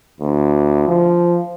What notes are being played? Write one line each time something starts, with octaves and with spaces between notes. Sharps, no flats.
D2
F3